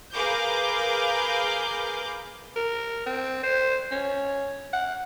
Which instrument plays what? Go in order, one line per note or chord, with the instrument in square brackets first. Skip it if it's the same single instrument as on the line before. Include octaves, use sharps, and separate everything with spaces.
[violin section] G#4 A#4 B4 F5 D6 G6
[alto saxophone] A#4
C4
C5
C#4
F#5